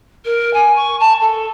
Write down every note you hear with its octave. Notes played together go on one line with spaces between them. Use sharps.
A#4
G#5
C#6
A5
A4